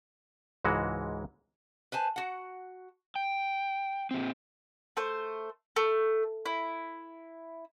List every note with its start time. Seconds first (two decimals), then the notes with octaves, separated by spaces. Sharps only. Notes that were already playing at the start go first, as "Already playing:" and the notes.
0.64 C#2 G#2 E3 G#3 F#4
1.92 B4 C5 G#5 A5
2.16 F#4 F#5
3.16 G5
4.11 A#2 C4
4.97 A3 C5
5.76 A3
6.46 E4